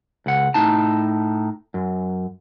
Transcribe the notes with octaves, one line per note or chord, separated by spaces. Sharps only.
C#2 F#5
A2 D#4 A5
F#2